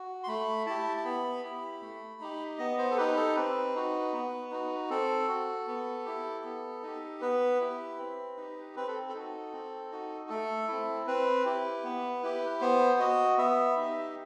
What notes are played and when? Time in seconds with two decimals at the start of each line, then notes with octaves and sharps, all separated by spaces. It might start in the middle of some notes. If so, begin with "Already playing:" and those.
Already playing: F#4
0.23 C6
0.27 A3 B5
0.66 E4 G4 A5
0.97 A5
1.05 B3 B5
1.43 E4 G4
1.82 A3
2.20 D#4 G4
2.58 B3 D#5
2.78 C5
2.91 A4
2.97 D#4 G4 B4
3.16 A4
3.36 C4 B4
3.75 D#4 F#4
4.13 B3
4.51 D#4 F#4
4.90 C4 A4
5.28 F#4
5.67 B3
6.05 E4 G4
6.44 B3
6.83 D#4 G4
7.21 B3 B4
7.60 E4 G4
7.99 C4
8.37 D#4 G4
8.76 C4 B4
8.87 A4
9.09 A4
9.14 D#4 F#4
9.53 C4
9.92 D#4 F#4
10.29 A3 A4
10.68 C4 E4
11.07 C4 B4
11.45 E4 G4
11.84 B3
12.23 E4 G4
12.61 B3 C5
13.00 F#4 D#5
13.38 B3 E5
13.77 D#4 G4